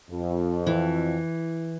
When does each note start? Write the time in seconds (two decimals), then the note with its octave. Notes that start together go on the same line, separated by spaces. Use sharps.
0.10 F2
0.67 E3